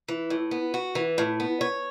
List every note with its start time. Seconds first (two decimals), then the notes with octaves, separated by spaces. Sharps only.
0.08 E3
0.30 A2
0.51 B3
0.74 F#4
0.95 E3
1.18 A2
1.40 B3
1.61 C#5